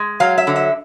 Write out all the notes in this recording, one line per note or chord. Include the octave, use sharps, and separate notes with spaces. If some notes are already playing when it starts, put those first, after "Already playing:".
Already playing: G#3
F#3 F5
E5
D3
E5